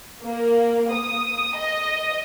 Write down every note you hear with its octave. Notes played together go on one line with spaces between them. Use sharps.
A#3
D#6
D#5